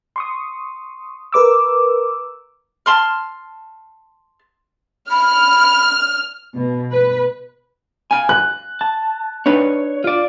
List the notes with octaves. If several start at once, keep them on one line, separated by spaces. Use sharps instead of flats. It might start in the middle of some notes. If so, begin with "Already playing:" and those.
C6 C#6 D#6
A#4 B4 D6 E6
A5 C6 F6
B5 F6
B2
B4
F5 G#5
F#6
A5
D4 D#4 B4 C#5
F4 D5